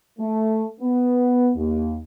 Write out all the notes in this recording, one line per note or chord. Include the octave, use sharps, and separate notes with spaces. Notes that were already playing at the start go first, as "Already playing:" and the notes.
A3
B3
D#2